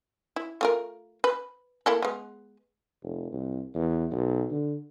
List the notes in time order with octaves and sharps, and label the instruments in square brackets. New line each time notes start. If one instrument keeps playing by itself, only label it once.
[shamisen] E4
A3 F4 A#4
B4
A#3 E4 A4
G#3 B3
[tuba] F1
C2
E2
B1
D3